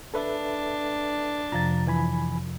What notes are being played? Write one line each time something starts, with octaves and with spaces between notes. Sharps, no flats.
D4 A4 B4 E5
F2 C3 F3 A#5 A6
E3 G#5 B5